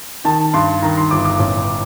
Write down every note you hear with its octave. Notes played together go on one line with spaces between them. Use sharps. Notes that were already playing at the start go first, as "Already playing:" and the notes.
D#3 A5
G2 C6
D#3 A#5
C6
G1 D6
D6
A1